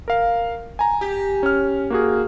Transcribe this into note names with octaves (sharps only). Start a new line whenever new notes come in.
A#4 F5
G#5 A#5
G4
C#4 F6
A#3 F#4 G#4